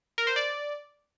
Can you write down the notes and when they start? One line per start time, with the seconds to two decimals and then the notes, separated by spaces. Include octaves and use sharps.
0.18 A#4
0.27 C5
0.36 D5